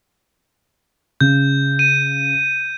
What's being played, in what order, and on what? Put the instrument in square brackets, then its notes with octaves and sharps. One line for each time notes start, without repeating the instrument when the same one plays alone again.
[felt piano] C#3 [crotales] G6
[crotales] D#7